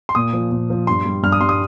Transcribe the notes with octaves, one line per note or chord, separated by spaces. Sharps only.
C6
A#2 D#6
F3
A#2
F3
G2 C6
G3
G2 F6
D#6
G3 C6
D#6